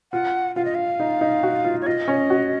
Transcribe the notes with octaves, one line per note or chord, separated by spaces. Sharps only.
F4 F#5
F4 F5
D#5
F5
D#4
D#4
F#4
F4
C#5
F4 D#5
C#4
F#4